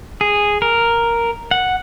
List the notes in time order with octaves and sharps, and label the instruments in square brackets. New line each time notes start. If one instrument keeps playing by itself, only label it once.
[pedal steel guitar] G#4
A#4
F#5